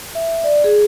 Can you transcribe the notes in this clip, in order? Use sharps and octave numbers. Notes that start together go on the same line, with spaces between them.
E5
D5
G#4